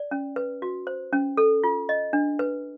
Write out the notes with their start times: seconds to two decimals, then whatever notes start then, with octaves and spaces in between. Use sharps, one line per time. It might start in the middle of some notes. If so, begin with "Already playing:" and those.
Already playing: D5
0.11 C#4
0.36 B4
0.62 F#4
0.87 C5
1.13 C#4
1.37 A4
1.64 F4
1.89 D#5
2.13 D4
2.39 B4